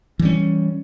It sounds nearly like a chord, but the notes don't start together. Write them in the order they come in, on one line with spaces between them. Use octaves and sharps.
E3 G3 C#4